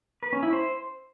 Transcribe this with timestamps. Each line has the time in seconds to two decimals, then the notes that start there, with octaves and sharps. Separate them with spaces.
0.23 B4
0.33 C#4
0.43 E4
0.53 C5